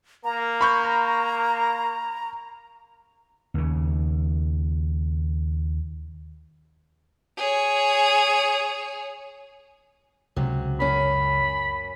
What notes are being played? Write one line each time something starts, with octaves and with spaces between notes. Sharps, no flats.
A#3 A#5
B5 C#6 G6
D#2 C#3
G#4 C#5
C#2 C3 F#3
F#2 C#4 B5